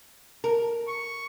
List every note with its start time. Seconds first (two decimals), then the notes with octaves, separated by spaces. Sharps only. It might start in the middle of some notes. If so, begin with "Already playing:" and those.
0.44 A#4
0.87 C#6